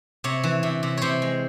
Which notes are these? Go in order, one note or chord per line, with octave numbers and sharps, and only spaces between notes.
C3 C#5
E3
C3
C3
C3 C5 C#5
G#3